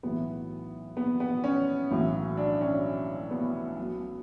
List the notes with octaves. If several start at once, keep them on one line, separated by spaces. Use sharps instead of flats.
B1 A2 E3 B3
B3
B3
C#4
B1 A2 E3
D4
C#4
B3
B1 B2